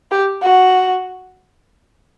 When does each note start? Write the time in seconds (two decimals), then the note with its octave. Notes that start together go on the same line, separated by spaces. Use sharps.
0.11 G4
0.43 F#4